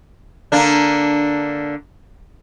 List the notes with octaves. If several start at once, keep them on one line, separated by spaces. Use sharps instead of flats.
D3 A#3 D4